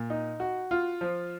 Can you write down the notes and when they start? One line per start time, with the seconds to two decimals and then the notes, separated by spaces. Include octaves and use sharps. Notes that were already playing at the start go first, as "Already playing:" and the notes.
Already playing: A#2
0.10 D#4
0.40 F#4
0.71 F4
1.01 F3